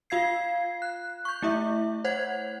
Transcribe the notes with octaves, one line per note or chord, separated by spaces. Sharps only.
F4 F5 G#6 C7
F#6
C#6 G6
A3 E4 E5
C5 C#5 F#5 G#6